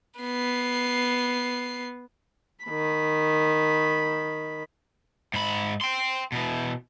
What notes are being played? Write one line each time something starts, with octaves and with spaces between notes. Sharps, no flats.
B3 C7
D#3 B5
G#2 B5
G5 C6
B2 E3